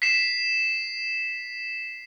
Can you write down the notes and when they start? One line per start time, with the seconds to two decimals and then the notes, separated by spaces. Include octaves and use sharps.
0.02 B6 C7 E7